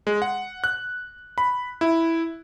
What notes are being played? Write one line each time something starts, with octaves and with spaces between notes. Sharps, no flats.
G#3
F#5
F#6
B5
E4